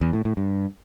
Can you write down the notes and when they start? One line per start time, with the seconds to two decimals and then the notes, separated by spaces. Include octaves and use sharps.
0.01 E2
0.13 A2
0.25 A2
0.37 G2